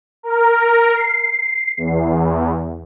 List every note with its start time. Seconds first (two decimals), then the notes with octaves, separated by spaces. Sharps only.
0.23 A#4
0.95 C7
1.78 E2